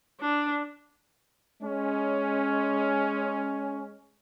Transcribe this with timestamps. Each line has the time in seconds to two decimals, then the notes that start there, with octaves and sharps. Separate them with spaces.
0.21 D4
1.62 G#3 C#4